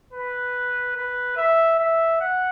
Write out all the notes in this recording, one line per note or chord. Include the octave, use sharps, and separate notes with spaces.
B4
B4
E5
E5
F#5